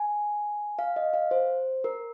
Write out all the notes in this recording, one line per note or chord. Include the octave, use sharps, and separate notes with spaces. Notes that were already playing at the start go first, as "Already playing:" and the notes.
Already playing: G#5
F5
D#5
F5
C5
A#4